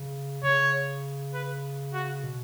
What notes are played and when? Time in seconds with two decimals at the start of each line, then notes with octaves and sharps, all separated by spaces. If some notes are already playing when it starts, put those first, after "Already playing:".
Already playing: C#3
0.43 C#3 C#5
1.34 B4
1.94 F#4
2.24 B2